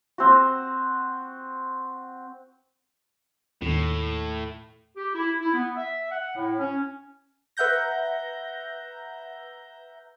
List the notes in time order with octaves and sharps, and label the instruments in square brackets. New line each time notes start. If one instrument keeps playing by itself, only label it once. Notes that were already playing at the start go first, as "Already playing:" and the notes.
[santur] C4 F#4
[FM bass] D#2 [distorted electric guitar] A2
[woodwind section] G4
E4
E4
B3
E5
F#5
A2
C#4
[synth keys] B4 E5 F#5 A#5 G6 A#6